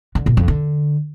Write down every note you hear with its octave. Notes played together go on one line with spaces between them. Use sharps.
D3
A#2
F2
D3